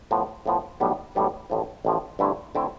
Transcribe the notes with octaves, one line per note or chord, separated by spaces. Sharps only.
A2 F3 B3
A2 F3 B3
B1 A2 G3 B3
B1 A2 G3 B3
A1 A2 F3
A1 A2 F3
G2 D3 A3 C4 E4
D3 A3 C4 E4